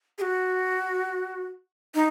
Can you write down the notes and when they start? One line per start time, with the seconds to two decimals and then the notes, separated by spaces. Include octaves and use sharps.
0.18 G#4
0.22 F#4
1.95 D#4